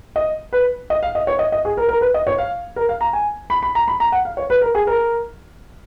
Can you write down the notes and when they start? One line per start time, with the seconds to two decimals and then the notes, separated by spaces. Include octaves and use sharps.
0.16 D#5
0.53 B4
0.90 D#5
1.03 F5
1.15 D#5
1.27 C#5
1.39 D#5
1.52 D#5
1.65 G#4
1.77 A#4
1.89 A#4
2.01 B4
2.14 D#5
2.27 C#5
2.38 F5
2.76 A#4
2.89 F5
3.01 A#5
3.13 G#5
3.50 B5
3.62 B5
3.75 A#5
3.88 B5
4.00 A#5
4.12 F#5
4.25 F5
4.37 C#5
4.50 B4
4.61 A#4
4.75 G#4
4.87 A#4